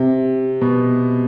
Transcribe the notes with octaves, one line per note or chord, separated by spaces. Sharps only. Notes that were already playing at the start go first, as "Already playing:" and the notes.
Already playing: C3
B2